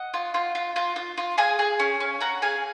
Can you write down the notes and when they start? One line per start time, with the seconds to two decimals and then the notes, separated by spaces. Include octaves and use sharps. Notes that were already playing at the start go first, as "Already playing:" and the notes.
Already playing: D#5 F#5
0.14 F4
0.34 F4
0.55 F4
0.76 F4
0.96 F4
1.17 F4
1.38 G#4 F5 G#5
1.59 G#4
1.79 C#4
2.00 C#4
2.20 C#4 F#5 A#5
2.42 G#4 F5 G#5